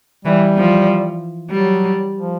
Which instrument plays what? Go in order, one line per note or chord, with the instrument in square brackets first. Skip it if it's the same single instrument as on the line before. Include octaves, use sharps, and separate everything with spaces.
[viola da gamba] E3 [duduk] G3
[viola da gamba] F3
[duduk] F#3 [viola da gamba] G3
[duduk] F3